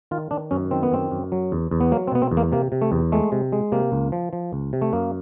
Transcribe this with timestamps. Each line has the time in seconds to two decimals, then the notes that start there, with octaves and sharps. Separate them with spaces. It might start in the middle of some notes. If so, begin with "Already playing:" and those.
0.11 D#3 F4
0.31 D#3 D4
0.51 F#2 C#4
0.71 D#3 C4
0.83 B3
0.92 F#2 C4
1.11 F#2
1.32 F#3
1.52 E2
1.71 E2
1.80 B3
1.92 F#3 A#3
2.08 C4
2.12 B2 B3
2.22 C4
2.31 E2
2.37 A#3
2.52 C3 A#3
2.72 C3
2.82 A3
2.92 E2
3.12 G#3 A3
3.32 C3
3.52 G#3
3.72 C3 A#3
3.92 C#2
4.12 F3
4.33 F3
4.53 C#2
4.73 C3
4.82 A3
4.93 F#2 A#3